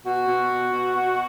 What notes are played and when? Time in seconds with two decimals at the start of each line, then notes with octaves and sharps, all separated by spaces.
0.05 B2 F#4
0.28 B2
0.50 B2
0.72 B2
0.96 B2